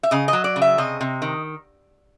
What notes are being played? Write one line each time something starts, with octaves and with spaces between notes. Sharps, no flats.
E5
C#3 D#5
D#5
F#3
D5
C#3
E5
C3 D#5
C3
D#3